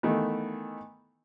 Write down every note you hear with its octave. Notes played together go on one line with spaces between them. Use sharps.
D#3 E3 A3 B3